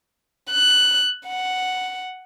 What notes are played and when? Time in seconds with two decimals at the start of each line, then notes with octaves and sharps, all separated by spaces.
0.51 F#6
1.28 F#5